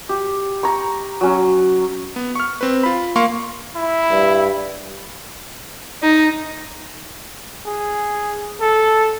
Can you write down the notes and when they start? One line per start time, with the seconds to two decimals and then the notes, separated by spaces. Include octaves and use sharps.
0.09 G4
0.63 A#5 C#6
1.21 F#3 C#4
2.16 B3
2.35 C#6 F6
2.61 C4 B4
2.83 F4 B5
3.16 A#3 F5 C6 C#6
3.76 E4
4.11 G2
6.03 D#4
7.66 G#4
8.60 A4